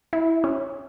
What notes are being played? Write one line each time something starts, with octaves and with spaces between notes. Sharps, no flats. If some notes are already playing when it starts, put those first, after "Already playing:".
E4
C#4